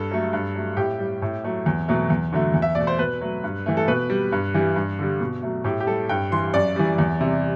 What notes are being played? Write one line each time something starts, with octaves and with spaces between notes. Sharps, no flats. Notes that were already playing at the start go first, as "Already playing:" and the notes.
Already playing: G2 A4
F#3 A3
G2
F#3 A3
A2 G4
G3
A2
F#3 A3
E2
B2 F#3 A3
E2
D3 F#3 A3
E2
E5
B2 A3 D5
C5
B2 B4
F#3 A3
G2
E3 A3
A4
B2 B4
G3
G2
E3 G3
G2
D3 G3
B2
F#3 A3
A2 G4
G4
G3 A4
G2 G5
E3 G3 C6
F#2 D5
E3 G3
E2
C3 G3